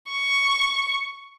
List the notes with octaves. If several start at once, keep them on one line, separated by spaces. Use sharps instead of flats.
C#6